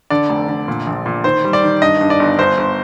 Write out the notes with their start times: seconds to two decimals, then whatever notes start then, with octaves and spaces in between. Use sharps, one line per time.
0.10 D3 D5
0.30 F1
0.48 D3
0.68 A#2
0.87 A#1
1.06 A#2
1.24 D#3 C5
1.44 G3
1.53 D5
1.63 D#3
1.81 G2 D#5
2.01 G2
2.10 D5
2.19 G1
2.38 G1 C5
2.57 G1